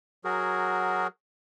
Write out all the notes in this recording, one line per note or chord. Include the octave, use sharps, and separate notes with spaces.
F#3 F#4 G#4 A#4